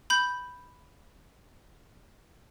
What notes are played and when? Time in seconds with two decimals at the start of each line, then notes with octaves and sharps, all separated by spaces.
0.10 B5 G6